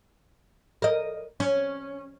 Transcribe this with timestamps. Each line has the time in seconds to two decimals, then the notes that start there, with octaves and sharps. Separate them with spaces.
0.82 A#4 D#5
1.40 C#4